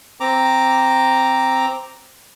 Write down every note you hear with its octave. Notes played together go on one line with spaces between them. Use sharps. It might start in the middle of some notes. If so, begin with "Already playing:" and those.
C4 A#5 D6